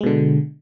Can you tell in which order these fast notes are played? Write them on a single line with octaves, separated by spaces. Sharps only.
G#3 B2 D3